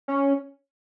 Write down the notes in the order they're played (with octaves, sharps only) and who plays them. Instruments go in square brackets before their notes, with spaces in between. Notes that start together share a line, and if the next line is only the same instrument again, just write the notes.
[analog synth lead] C#4